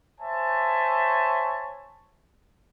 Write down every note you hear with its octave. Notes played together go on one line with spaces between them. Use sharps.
C5 C#5 E5 G#5 A5